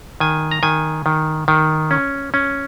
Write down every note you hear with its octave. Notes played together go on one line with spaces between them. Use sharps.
D#3 G#5
A#5
D#3 G#5
D#3
D#3
C#4
C#4